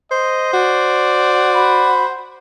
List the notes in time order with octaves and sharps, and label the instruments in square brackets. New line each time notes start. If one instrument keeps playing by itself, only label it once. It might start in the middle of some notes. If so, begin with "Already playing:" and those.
[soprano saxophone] C5 [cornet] D#5
[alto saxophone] F#4 [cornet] D5
[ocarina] B5